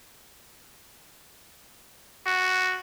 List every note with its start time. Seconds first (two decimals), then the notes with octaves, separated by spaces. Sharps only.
2.26 F#4